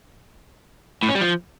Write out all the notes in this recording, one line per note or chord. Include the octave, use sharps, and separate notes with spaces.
A2
C#4
G3
F3